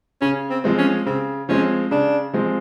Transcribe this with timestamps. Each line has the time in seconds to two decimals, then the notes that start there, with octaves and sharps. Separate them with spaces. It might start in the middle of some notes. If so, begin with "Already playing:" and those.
0.21 C#3 C#4
0.50 C4
0.64 F3 G#3 C4
0.78 C#4
1.06 C#3 C4
1.49 F3 G#3 C4 C#4
1.91 C#3 D4
2.34 F3 G#3 C4